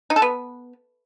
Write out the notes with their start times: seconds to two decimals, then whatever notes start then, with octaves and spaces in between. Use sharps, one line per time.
0.10 D#4
0.16 A4
0.22 B3